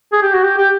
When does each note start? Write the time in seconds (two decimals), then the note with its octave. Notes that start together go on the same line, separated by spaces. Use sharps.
0.12 G#4
0.22 G4
0.33 F#4
0.43 G4
0.57 G4